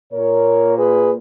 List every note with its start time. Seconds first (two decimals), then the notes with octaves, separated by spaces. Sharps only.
0.13 A#2 A#4 C#5
0.77 G#4 B4